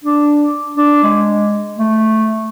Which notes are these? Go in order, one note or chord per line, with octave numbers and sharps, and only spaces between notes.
D4
D4
G#3
A3